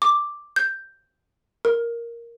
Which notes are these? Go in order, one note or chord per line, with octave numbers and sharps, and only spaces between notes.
D6
G6
A#4